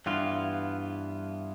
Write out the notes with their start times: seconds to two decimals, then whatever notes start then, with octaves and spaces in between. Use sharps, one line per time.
0.06 G2 E3 B3 F4